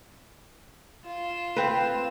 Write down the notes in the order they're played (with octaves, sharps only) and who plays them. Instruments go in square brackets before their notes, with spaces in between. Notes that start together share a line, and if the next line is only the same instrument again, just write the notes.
[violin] F4 E7
[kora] C4 B4